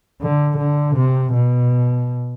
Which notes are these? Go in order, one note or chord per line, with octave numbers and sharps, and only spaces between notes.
D3
D3
C3
B2